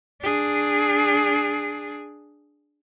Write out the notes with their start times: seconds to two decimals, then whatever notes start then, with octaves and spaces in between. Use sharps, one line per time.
0.22 D4 G#4